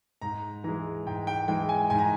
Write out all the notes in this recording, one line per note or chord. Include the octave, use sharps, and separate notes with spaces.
G#2 A#5
E3 G#3 A#5
G#2 G5
G5
E3 G#3 G5
G#5
G#2 G#5
A#5